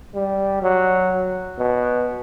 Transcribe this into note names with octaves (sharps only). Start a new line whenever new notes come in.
G3
F#3
B2